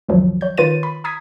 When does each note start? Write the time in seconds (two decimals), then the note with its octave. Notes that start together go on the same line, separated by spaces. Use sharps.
0.08 C#2 F#2 D#3 F3 F#3
0.41 C#5 G6
0.57 D#3 F4 B4 C#5 A6 D#7
0.83 B5
1.04 A#5 D#6 G#6 B6